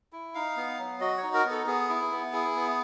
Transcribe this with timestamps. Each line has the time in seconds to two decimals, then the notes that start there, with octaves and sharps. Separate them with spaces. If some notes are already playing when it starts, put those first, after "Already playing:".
0.13 E4
0.35 D#4 F5
0.57 B3
0.79 F#3
1.01 F#4 D#5
1.18 C#5
1.23 D#4
1.34 A#4
1.45 B3
1.51 A4
1.67 B3 G#4
1.89 E4
2.11 B3
2.33 E4 G#4
2.56 B3